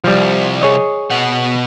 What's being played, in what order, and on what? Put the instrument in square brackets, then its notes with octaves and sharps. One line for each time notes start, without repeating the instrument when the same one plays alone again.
[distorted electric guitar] C2 [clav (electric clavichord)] F3 G3
[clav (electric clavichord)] G#4 C#5 D#5
[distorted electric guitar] B2 F#5